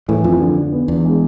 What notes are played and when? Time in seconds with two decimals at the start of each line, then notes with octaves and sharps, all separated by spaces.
0.08 A2 E3
0.24 F2 F3
0.40 D3
0.56 D3
0.72 B3
0.88 E2 D4
1.05 G#3